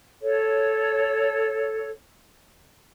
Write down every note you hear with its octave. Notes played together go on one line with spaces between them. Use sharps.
A4 C#5